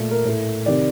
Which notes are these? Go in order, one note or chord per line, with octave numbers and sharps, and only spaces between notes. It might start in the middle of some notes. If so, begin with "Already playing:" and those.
Already playing: A#2 A3
A#4
A2 A3
C3 D#3 D5